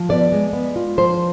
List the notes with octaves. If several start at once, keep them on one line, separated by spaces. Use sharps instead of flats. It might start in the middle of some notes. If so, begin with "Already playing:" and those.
Already playing: F3
B3 D5
G#3
B3
F4
F3 C5